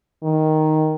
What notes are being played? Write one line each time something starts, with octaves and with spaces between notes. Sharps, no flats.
D#3